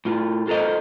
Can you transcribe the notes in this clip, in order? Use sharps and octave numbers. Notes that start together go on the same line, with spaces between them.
A2 F4
F4 A4 A#4 C5 D#5